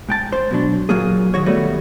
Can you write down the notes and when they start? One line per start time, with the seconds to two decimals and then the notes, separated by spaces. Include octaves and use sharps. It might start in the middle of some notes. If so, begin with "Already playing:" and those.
0.09 G#2 G5 A5
0.32 C5
0.51 B2 F#3 D4
0.89 A#2 F#3 A#3 G#4
1.34 D#3 F#4 C#5
1.46 D#3 G3 A3 B3 F#4